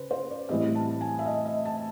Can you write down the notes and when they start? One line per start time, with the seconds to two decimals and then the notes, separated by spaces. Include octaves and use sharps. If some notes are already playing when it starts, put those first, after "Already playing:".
Already playing: C#3 B4 C5
0.11 C5
0.30 D5
0.49 A2 E3 G3 C4 D#5
0.75 A5
1.01 G#5
1.19 E5
1.26 D#5
1.46 D#5
1.65 A5